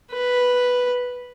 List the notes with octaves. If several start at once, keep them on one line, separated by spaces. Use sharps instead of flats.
B4